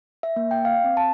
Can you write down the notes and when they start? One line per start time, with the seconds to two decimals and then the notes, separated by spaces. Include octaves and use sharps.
0.23 E5
0.36 A#3
0.51 G5
0.65 F5
0.84 C4
0.97 A5